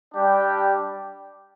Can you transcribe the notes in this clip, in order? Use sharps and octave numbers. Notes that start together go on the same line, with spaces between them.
G3 D4 G4 D5 G5